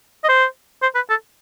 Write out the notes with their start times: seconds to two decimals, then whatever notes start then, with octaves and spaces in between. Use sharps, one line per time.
0.24 D#5
0.29 C5
0.82 C5
0.95 B4
1.09 A4